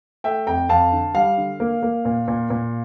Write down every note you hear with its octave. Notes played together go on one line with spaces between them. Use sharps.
A3 E5 G5
F2 G5 A#5
F2 F5 A5
D3
G3 F5
D3
A#3
A#3
A#2
A#2
A#2